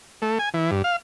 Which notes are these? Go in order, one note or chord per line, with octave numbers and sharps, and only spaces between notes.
A3
G#5
E3
G2
F5